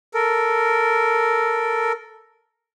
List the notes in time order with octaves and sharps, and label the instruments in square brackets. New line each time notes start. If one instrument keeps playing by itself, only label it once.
[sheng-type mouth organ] A4 A#4